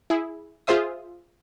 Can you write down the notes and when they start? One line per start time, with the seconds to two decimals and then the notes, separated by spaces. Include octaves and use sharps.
0.10 E4 G#4
0.67 F4 G#4 C5 E5 D#6